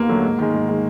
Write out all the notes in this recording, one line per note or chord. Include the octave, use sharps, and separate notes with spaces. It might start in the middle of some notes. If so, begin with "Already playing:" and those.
Already playing: D#2 A#3 B3
D3 F#3 A3
G#2
D#3 G#3
G#2
D#3 G#3